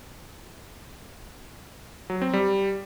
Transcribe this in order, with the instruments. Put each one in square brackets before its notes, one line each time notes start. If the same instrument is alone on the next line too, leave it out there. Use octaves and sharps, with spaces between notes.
[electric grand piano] F#3
C4
G3